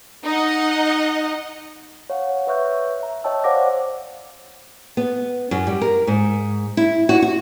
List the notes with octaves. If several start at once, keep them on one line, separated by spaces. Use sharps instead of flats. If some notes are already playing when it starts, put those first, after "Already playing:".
D#4 D#5 F#5
C#5 F5 F#5
B4 C#5 E5 C#6 F#6 G6
E5 A#5
C#5 D#5 G5 A5 E6
C5 D5 F5 F#5 D6 A#6
B3
F#2
G3
A#4
G#2
E4
F#4
F#4